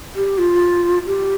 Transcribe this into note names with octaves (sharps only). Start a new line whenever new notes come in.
G4
F4
G4